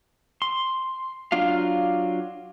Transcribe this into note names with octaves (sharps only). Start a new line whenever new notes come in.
C6
F#3 D4 F4 F5